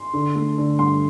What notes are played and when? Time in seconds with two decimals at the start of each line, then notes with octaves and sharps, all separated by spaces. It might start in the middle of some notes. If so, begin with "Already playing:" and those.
Already playing: C6
0.13 D3
0.36 A3
0.58 D3
0.79 G2 C6